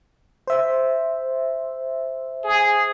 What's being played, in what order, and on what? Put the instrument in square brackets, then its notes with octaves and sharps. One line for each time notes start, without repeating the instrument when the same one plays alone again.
[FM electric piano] C5 E5
[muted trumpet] G#4